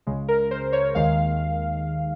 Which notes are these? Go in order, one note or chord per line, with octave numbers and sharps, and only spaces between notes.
C#2 C#3 G#3
A#4
C5
C#5
D#2 D#3 G#3 F5